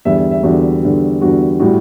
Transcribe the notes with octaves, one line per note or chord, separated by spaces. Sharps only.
E2 D3 G3 E5
E5
E5
E2 D3 G3 F#4
E2 D3 G3
E2 D3 G3 F#4
A2 G3 F#4